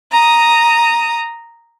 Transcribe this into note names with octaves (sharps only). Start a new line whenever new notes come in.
A#5 D#6